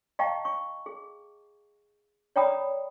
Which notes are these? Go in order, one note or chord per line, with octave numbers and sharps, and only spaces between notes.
D#5 F5 G5 A5 A#5 C#6
C#6
G#4
C#5 D5 G5 A#5 B5 D#6